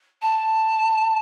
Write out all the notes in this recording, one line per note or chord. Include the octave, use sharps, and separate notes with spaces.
A5